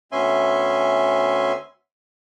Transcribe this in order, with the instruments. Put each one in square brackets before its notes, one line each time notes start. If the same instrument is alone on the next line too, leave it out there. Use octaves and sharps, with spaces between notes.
[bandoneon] D2 B3 C#4 E5 G#5 C6